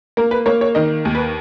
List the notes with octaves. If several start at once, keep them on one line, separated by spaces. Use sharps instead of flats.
A#3 A#4
B4
A#3 C#5
C#5
D#3 D#5
D#2
B4